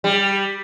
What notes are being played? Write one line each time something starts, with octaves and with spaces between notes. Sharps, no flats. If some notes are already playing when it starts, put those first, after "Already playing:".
G3